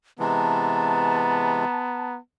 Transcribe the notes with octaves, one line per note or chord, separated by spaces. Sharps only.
C3 E3 G#3 B3 A5 A#5